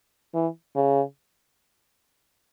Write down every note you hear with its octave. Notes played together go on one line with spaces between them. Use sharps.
E3
C#3